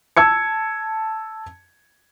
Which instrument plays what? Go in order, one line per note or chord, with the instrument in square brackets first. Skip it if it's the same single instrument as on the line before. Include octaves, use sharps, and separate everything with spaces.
[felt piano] A5 E6 G#6 C#7